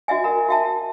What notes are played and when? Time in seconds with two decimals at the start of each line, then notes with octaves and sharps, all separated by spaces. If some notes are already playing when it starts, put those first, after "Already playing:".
0.08 F#4 D#5 E5 G#5
0.24 A#4 A#5
0.49 F#4 E5 A5